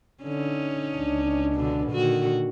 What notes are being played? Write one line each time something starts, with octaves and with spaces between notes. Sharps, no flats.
D3 C#4 D#4
C#2 D4
B2 D3
A#2 D3 D#3 F#4